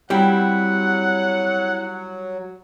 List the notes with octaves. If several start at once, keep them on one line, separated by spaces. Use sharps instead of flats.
F#3 G3 C4 E4 F#5 G5